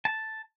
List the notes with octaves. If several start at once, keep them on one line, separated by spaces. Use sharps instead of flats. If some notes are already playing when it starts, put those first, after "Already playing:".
A5